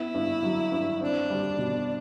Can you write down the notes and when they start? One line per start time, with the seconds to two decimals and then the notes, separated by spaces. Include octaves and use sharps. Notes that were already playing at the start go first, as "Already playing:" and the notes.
Already playing: B3 E4
0.14 G2
0.43 F#3
0.72 G2
1.01 C4 D4
1.30 G3
1.58 B2